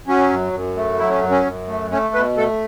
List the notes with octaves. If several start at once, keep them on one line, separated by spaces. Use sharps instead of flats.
F#3 C#4
F#2
F#2
A3
F#3 E4
C#4
F#2
C#4
F#2
A3
A3 C#4
B2 B4
A3 A4